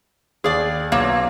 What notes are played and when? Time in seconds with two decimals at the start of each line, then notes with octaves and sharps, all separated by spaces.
0.44 D#2 G#4 D5
0.92 B1 A#3 C#5